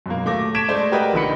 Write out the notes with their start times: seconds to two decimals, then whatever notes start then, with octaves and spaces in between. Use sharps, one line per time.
0.06 F#2 B2 A#3
0.25 D#1 A3 D6 A#6
0.54 A5 C#6 G#6 B6 D7 E7
0.68 G#3 A3 C5 D5
0.92 G4 A#4 B4 D5 D#5 F#5
1.13 A#1 D3 D#4 B5 C#7